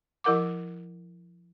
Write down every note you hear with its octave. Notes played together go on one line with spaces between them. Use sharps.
F3 E4 A#4 F#5 D6